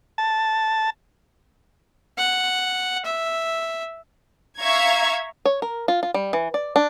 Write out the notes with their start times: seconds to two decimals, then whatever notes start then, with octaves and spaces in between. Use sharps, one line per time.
0.18 A5
2.18 F#5
3.05 E5
4.60 E5 F5 A#5 C#6 G#6
5.45 C#5
5.62 A#4
5.88 F4
6.03 F4
6.14 G3
6.33 E3
6.54 D5
6.76 D4